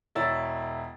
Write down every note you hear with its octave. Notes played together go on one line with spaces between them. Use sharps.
E1 E4 C#5 E6 A6